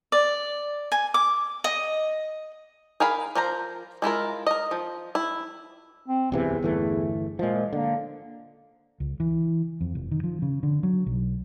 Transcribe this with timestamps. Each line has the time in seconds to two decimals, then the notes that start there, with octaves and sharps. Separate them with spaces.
0.12 D5
0.92 G#5
1.14 D6
1.64 D#5
3.00 G#4 A#4 F5 B5
3.35 F3 A#4 C5 A#5
4.02 G#3 E4 F4 A#4
4.47 A#4 D#5
4.71 F3
5.15 E4
6.08 C4
6.32 D1 E2 C3 E3
6.63 G1 E3 A3
7.39 A#2 F3 G#3
7.73 D3 A#3
9.00 C#2
9.20 E3
9.81 F2
9.95 F1
10.11 D#3
10.24 F3
10.42 C#3
10.63 D3
10.83 F#3
11.06 B1